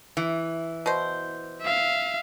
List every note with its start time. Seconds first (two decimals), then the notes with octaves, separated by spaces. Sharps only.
0.17 E3
0.86 B2 C5
1.61 E5 F5